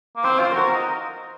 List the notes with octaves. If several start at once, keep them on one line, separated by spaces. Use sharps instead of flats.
A#3
C4 C5
F4
F#4 A#4
D#4